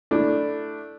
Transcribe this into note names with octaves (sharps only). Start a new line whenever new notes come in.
A3 D4 E4